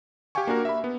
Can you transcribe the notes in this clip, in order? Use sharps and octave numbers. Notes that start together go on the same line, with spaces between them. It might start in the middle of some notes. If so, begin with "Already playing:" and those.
G4 F5 G5 G#5 C#6
A#3 D4 F#4 A#4
E5 B5
B3